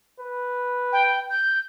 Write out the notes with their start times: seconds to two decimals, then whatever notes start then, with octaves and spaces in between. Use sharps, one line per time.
0.19 B4
0.93 G5
1.30 G6